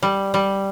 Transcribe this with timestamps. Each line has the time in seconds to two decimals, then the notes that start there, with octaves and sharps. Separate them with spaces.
0.03 G3
0.34 G3